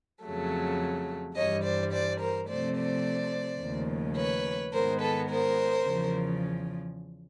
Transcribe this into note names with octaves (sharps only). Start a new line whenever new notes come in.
F2 C#3 F#3 A3
G2 E3 G3 C#5 D#5
C5 D5
C5 D5
A#4 C5
C3 F3 A3 C5 D5
C5 D5
D#2 C#3 F3 A3
B4 C#5
G#2 D#3 G#3 B3 A#4 C5
A4 B4
A#4 C5
E2 C#3 F3